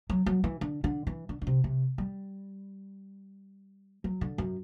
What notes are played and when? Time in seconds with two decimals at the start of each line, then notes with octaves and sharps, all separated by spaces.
0.10 F#3
0.26 F#3
0.44 E3
0.61 D3
0.84 D3
1.07 E3
1.29 D3
1.42 D3
1.47 C3
1.64 C3
1.98 G3
4.04 F#3
4.21 D3
4.38 F#2